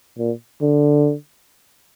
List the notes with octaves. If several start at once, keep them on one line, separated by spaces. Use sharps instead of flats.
A#2
D3